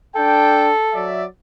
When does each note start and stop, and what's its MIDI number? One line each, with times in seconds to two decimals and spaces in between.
0.16 0.69 62
0.16 1.10 69
0.16 0.69 79
0.93 1.24 54
0.93 1.24 74
0.93 1.24 76